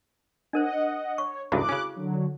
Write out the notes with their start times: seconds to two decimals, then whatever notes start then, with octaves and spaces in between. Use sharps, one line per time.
0.53 D4 A#4 C5 D#5 F#5
1.18 C#5 C#6
1.52 C#2 G2 C3 E4 F#4 A4 D6 F#6
1.69 C#3 C#4
1.96 D3 F#3